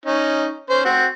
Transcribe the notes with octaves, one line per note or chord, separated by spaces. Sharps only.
C#4 D#4
C#4 C5
C4 F#4